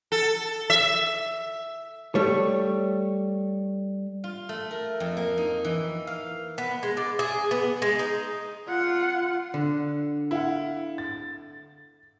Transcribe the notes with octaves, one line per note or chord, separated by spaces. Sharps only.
A4
E5
G3 A3 C#5
F4
A3
A#4
F2
A#3
D#4
E3
F5
B3
G#3
D5
G#4
B3
G#3
D#4
F4 F#5
D3
E4 F5 F#5
A6